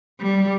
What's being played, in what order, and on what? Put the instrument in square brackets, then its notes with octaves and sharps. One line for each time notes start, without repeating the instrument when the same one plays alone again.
[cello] G3